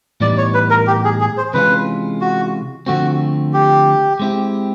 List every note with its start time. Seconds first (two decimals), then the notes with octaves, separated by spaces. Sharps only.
0.21 A2 E3 G3 B3 D#4 D5
0.38 C#5
0.54 B4
0.70 A#4
0.87 G4
1.05 G#4
1.21 G#4
1.37 C5
1.54 C3 E3 G#3 C#4 F4 B4
2.21 F#4
2.86 D3 F3 A3 C4 F#4
3.53 G4
4.19 G#3 C4 E4 G4